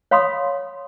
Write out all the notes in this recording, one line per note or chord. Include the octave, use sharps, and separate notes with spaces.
C#5 F5 B5 C6 D#6